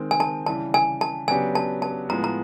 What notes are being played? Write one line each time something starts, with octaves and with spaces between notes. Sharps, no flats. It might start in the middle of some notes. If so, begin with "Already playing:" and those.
Already playing: D#3 G#3 C4
G#5
A5
C#3 E3 G3 A5
G#5
A5
C#3 F#3 B3 D4 G4 G#5
A5
A5
A2 F3 G#3 B3 A#5
A#5